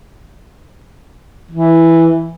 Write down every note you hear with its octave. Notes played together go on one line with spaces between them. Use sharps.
E3